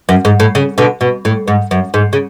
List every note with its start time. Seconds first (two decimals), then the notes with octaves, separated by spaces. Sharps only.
0.09 F#2
0.25 G#2
0.40 A2
0.55 C#3
0.78 B2 D3
1.01 B2
1.25 A2
1.48 G#2
1.71 F#2
1.94 G#2
2.13 C#3